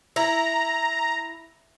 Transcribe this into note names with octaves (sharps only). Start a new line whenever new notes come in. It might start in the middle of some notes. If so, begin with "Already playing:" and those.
E4 A#5